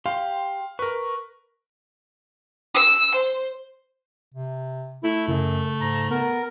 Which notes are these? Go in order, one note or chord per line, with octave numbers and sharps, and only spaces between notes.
G4 F5 C6
A#4 B4 C#6
E6
C5
C3
A3 E4
F#2 C#3
G#2 A#5
B3 A#4